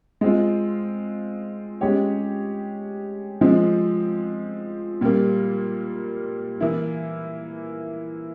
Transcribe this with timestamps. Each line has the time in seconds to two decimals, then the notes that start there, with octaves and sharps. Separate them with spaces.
0.21 G#3 C4 F4
1.81 G#3 C#4 G4 C#5
3.41 F3 G#3 C4
5.01 A#2 G3 A#3
6.60 E3 A#3 E4